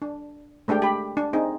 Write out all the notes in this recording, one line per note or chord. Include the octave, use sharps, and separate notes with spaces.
D4
G#3 A3 D4 G4 G5
G4 B5
D4
C4 D#4 G#4